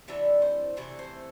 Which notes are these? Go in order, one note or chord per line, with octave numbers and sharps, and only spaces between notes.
C3 E3 A3 D4 E5
C5
C3 E3 A3 D4
C5